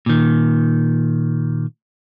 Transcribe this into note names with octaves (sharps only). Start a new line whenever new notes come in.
A#2 D#3